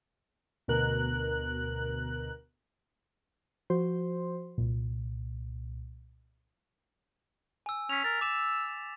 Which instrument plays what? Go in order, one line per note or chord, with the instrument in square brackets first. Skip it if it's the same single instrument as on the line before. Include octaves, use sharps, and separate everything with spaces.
[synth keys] D2 B2 A#4 F#6
F3 F#4 C5 C6
C2 A#2
[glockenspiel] G#5 E6
[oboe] C#4 [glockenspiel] B6 F7
[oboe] A#4 [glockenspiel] A6
[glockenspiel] D6 E7 [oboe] E6